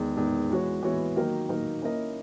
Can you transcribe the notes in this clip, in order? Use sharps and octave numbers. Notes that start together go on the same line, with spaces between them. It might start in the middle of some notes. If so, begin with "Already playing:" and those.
Already playing: E2 D#3 G#3
E2 D#3 G#3
E3 G#3 B3 F#4 C#5
E3 G#3 B3 F#4 C#5
D#3 F#3 A#3 D#4 A#4
D#3 F#3 A#3 D#4 A#4
A#3 C#4 E4 A#4 D#5